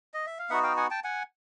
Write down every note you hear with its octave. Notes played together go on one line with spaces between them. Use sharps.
D#5
E5
F5
B3 D#4 F#4 E5 F#5
F5 G5
F#5 G#5
G5 A5
F#5 G#5